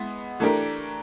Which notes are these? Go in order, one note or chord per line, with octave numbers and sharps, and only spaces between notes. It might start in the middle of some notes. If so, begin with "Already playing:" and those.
Already playing: G#3 B3 E4
E3 A3 D4 G4 A#4